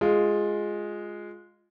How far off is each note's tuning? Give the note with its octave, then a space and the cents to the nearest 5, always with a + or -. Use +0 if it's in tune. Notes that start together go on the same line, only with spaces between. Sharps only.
G#3 +0 F4 +10